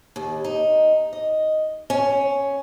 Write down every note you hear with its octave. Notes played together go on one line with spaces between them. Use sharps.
D#2
D#4
D#5
C#4